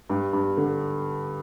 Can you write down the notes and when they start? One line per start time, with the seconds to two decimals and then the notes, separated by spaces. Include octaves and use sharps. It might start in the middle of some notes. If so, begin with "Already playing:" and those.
0.10 G2
0.33 G2
0.57 D3